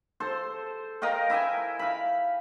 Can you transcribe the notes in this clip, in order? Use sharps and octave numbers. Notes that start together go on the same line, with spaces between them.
A4 C5
A#4 D#5 F5 G5
E4 E5 G5 G#5
F5 B5